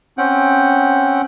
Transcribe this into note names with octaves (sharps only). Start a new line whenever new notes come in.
C4 C#4 F#5 G5